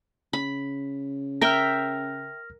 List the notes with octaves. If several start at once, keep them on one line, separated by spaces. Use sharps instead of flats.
C#3 B5
A#4 E5 G5 F6 A#6